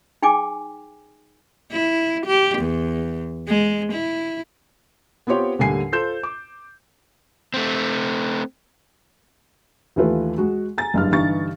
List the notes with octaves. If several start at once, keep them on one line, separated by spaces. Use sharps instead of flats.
D#4 G#4 G5 G#5 D6
E4
G4
E2
G#3
E4
B3 C4 F4 G4 C#5 G5
D#2 A2 D3 G3 G#5 C7
F4 A4 C5 G6 E7
D6
A3 C4
D#2 E3 A3 F4 B4
G#3 F#4
G#5 A#5 A6
F#1 G2 F6
G2 D3 E3 D#4 C#6 A6